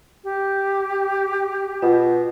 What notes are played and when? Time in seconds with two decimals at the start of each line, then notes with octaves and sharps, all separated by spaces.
0.24 G4
1.82 B2 F4